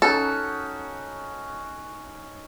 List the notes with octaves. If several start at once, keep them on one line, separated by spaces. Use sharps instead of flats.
C#4 D#4 F#4 A4